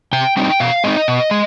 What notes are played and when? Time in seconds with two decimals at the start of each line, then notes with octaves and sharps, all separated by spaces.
0.13 C3 G5
0.37 G3 C4 D#4 G5
0.60 B2 F5
0.84 G#3 C4 D#4 D#5
1.08 B2
1.31 G#3